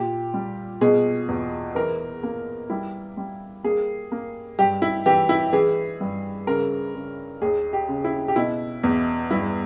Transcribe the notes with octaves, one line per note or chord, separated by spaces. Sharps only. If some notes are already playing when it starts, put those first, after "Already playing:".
Already playing: A#2 G4
G3
B2 G#4
E2
E3 A#4
A#3
G3 E4
G3
A#3 G#4
A#3
G2 G4
E4
E3 G4
E4
E3 G#4
G2
C#3 A#4
C#3
D#2 G#4
G4
C#3
E4
G4
B2 E4
E2
G2 E4